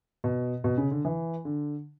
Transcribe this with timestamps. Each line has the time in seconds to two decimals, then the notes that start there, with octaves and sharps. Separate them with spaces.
0.24 B2
0.64 B2
0.78 C#3
0.91 D3
1.05 E3
1.45 D3